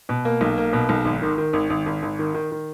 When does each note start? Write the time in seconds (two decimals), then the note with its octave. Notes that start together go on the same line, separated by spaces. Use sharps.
0.09 B2
0.25 A#3
0.41 B1
0.58 A#3
0.73 B2
0.89 B1
1.05 G#1
1.22 D#3
1.38 D#3
1.53 G#1
1.70 G#1
1.86 G#1
2.03 G#1
2.19 D#3
2.34 D#3
2.52 D#3